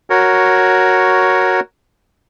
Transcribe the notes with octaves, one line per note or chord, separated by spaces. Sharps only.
F#4 A#4 C#5